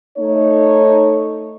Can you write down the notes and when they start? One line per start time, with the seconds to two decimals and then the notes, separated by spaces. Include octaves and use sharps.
0.18 A3 D#4 C#5